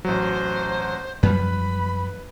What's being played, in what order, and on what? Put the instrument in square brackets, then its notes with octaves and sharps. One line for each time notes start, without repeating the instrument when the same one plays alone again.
[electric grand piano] A1 F#3 [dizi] C5
[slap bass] F#2 F3 G3 [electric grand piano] B4 [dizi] B5